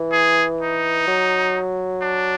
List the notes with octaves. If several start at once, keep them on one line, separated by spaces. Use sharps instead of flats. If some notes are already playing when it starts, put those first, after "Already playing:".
Already playing: E3
G#4
D#4
F#3
D4